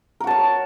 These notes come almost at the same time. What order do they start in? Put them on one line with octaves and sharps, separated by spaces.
A#4 F#4 A5 C#5